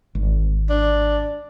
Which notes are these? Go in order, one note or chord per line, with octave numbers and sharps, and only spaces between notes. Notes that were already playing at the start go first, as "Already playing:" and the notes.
G#1
D4